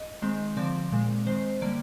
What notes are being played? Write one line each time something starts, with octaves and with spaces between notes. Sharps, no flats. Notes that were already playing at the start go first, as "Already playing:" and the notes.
Already playing: D#5
D#3 G#3 C4
D3 F3 C4 D5
A#2 G#3 C4
D#3 G#3 C4 C5
D3 G3 A#3 D5